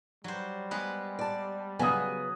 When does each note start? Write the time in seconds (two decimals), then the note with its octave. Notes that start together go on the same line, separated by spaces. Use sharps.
0.24 F#3 G3 C5
0.71 G#3 B3 B4
1.19 D5 A5
1.79 C#3 F#3 B3 G#5 D#6